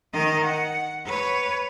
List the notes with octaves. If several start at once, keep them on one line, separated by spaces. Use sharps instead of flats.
D#3 D#5
F#5
B4 C#5